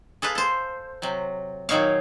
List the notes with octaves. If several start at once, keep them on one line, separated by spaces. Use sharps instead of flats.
G#4 A4 B4 F5
A4 C5
C3 F#3
A#2 D#3 F#3 D#4 C#5 F5